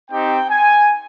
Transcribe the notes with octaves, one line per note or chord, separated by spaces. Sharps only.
C4 D#4 G4 G5
G#5